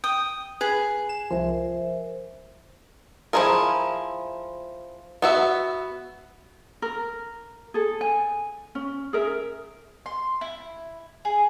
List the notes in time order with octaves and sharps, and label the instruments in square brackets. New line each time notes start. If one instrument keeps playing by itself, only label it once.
[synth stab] G5 [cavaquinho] D#6
[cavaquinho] G#4 [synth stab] B4
[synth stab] E7
[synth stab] C2 F3 [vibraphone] A#4 C5 E5
[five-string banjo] F3 G#3 E4 G#4 A#4
B3 F#4 E5
[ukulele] A#4
G#4 A4
G#5
C#4
G#4 A#4 E5
[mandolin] C6
E4
G#4